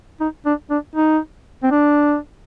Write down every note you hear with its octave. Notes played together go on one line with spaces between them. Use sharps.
D#4
D4
D4
D#4
C4
D4